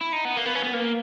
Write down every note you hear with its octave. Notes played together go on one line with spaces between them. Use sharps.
E4
D#4
B3
A#3
B3
C#4
B3
A#3